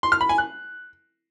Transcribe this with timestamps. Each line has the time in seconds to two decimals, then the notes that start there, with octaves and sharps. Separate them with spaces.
0.03 C6
0.12 F6
0.21 B5
0.29 G#5
0.38 F#6